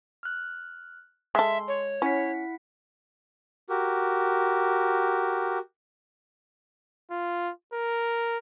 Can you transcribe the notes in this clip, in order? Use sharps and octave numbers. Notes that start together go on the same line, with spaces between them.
F6 F#6
G#3 A4 E5 C6
C#5
C#4 E4 F#5 B6
F#4 G4 A#4
F4
A#4